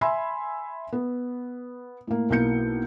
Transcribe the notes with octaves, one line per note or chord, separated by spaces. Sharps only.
E5 G#5 B5 C6 E6
B3
A2 A#3
B1 A#3 E4 G6 C#7